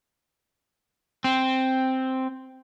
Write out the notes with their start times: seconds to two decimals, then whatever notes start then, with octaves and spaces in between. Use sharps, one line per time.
1.24 C4